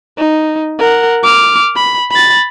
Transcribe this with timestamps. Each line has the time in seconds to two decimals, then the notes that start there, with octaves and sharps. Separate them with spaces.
0.18 D#4
0.79 A#4 F#5
1.24 D6 F6
1.76 B5
2.11 B5 A6